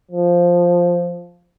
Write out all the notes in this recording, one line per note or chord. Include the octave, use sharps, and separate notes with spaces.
F3